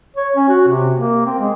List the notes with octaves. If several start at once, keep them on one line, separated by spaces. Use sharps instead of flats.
C#5
C#4
F#4
C3
A#3
C4
G#3